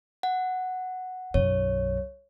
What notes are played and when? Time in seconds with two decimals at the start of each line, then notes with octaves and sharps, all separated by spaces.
0.23 F#5
1.34 B1 F#2 C#5